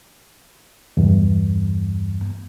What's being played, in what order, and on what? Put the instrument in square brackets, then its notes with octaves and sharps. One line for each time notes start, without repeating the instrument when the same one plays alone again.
[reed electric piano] E2 G2